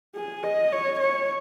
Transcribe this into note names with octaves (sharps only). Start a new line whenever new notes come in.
G#4
D#5
C#5
C#5